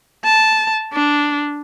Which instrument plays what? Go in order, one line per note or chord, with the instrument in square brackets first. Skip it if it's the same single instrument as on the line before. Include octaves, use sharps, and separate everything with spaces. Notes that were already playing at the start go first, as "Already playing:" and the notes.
[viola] A5
D4